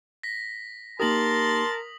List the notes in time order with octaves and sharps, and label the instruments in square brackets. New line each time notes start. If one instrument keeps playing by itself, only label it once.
[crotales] A#6 B6
[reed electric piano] A#3 D#4 G4 [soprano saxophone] A#4 [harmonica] A5 C6 [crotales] D#6 F#7